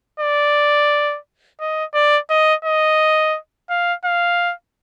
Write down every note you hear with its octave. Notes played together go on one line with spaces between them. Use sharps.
D5
D#5
D5
D#5
D#5
F5
F5